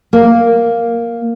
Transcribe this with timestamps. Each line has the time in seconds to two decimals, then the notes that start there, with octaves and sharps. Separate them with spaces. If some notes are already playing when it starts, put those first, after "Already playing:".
0.13 A#3